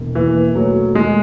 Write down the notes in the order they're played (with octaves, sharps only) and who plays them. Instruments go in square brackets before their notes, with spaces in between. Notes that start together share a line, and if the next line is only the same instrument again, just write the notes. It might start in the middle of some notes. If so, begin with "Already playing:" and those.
Already playing: [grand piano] E1 D#2
[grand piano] D#2 [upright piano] E3
[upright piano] F#3 [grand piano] A3
[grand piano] D#2 [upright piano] G#3